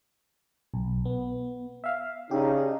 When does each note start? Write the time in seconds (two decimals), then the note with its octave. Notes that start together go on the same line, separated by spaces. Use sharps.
0.74 B1
1.05 B3
1.84 E5 F5
2.31 C#3 D4 D#4 G4